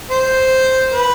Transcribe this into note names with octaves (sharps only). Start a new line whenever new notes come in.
C5
B4